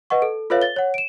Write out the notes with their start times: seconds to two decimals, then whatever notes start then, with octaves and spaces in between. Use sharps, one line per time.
0.10 B4 D#5 F#5 C#6
0.22 A4
0.50 F4 A4 B4 C#5 E5 F5
0.62 A6 G7
0.76 C#5 F#5
0.94 D7 E7